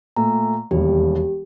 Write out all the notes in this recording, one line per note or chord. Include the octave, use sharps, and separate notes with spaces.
A#2 A3 A#5
E1 D#2 G3 G4